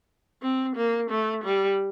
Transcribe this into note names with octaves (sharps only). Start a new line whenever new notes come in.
C4
A#3
A3
G3